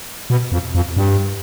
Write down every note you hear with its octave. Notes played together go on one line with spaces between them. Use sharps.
B2
F2
F2
G2